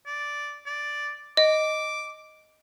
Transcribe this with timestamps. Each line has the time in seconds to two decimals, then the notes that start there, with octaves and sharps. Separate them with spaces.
0.06 D5
0.66 D5
1.37 D#5 D6